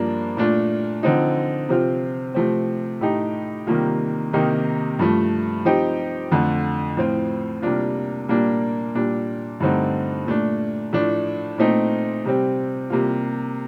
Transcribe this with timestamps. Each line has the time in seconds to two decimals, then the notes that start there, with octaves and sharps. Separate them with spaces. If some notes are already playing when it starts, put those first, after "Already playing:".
Already playing: G2 F3 A#3 D4
0.37 A#2 A3 D4 F4
1.03 D3 F3 C4 D#4
1.69 C3 F3 C4 F4
2.34 C3 F3 A3 C4
3.01 A2 A3 D#4 G4
3.67 C3 D#3 G3 A#3 F4
4.33 C3 D#3 A#3 D#4 G4
4.99 G2 F3 A3
5.65 F3 C4 D#4 G4
6.31 F2 D3 A3
6.97 A2 F3 C4 F4
7.62 C3 G3 A#3 D4 F4
8.29 A#2 G3 A#3 D4 F4
8.95 A#2 G3 D4
9.60 G2 D3 A3 C4 D#4
10.26 A#2 A3 D4
10.93 A2 F3 A3 D4
11.58 A#2 A3 C4 D#4
12.25 C3 G3 C4
12.90 C3 G3 A#3 F4